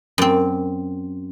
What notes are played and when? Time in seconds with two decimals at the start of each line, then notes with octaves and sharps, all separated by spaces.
0.18 F#2 C4